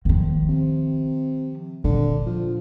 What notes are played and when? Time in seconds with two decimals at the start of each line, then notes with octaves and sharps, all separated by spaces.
0.05 D#3 F3
0.48 C3
1.84 A#2 D3
2.26 F3